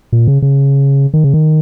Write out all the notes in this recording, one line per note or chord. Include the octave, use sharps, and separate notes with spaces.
A#2
C#3
C#3
D#3
C#3
D#3